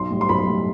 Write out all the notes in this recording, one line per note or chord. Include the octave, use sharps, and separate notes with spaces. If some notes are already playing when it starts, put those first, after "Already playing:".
Already playing: B1 C6
A2 G3
C6
B1 B5
A2 G3